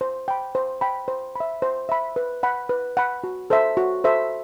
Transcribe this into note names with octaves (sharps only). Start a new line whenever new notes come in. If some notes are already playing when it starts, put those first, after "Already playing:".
C5
G5 B5
C5
G5 B5
C5
E5 B5
C5
E5 B5
B4
F#5 B5
B4
F#5 B5
F#4
A4 C5 E5
F#4
A4 C5 E5